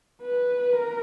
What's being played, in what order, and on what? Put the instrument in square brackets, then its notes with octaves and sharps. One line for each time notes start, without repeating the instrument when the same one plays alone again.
[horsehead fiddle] B4
A#4